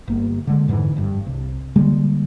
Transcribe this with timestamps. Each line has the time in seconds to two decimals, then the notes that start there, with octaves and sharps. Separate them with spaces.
0.08 G1 A#3
0.47 D3 G#3
0.68 F2 G#2 D3 E3
0.96 F1 G2
1.26 C2
1.76 D3 G3 G#3 A#3